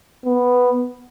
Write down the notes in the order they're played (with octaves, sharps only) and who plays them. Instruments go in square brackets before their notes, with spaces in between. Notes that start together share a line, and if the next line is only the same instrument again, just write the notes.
[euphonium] B3